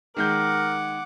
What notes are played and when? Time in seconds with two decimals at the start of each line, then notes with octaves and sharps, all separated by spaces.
0.17 D#3 G#3 A#4 F#5 D6 G6